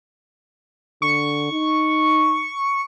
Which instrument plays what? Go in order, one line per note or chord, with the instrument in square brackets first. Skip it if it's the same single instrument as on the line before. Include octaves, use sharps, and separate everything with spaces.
[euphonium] D3 [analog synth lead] C#6
[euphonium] D#4